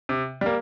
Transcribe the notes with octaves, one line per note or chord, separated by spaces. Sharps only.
C3
G3 A#3